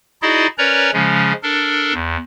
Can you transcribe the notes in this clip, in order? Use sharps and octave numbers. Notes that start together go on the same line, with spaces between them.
D#4 E4 F#4 G#4 D5 D#5
C#4 A#4 B4 C#5 D5 A#5
C#3 F3 G#3 C#4
D4 A4 A#4
E2